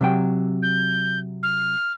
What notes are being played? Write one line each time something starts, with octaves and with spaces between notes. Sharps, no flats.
C3 F#3 G5
G6
F6